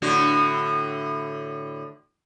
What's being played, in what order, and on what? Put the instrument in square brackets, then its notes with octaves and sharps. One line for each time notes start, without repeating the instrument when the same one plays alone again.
[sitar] A2 D3 F#4